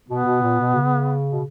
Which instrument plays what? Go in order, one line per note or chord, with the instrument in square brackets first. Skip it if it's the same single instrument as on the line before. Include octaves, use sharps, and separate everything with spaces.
[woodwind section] B2 [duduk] B3
[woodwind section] B2
A#2
B2
C#3
B2